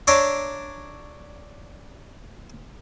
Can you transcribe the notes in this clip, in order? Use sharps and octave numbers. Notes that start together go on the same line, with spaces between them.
D4 C#5 D5 E5 A#5 C6